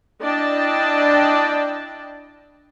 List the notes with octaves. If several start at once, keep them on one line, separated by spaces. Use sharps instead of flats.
D4 E4 D5 D#5 G5 A5